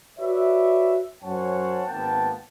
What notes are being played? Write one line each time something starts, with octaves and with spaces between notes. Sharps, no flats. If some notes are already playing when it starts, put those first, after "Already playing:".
F#4 B4 C#5 D5 E5
F#2 C#4 C5 C#5 F#5 A5
G#1 A#3 B3 G5 A5